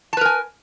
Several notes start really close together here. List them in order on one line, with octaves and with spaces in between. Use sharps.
A5 B4 A#4 G#5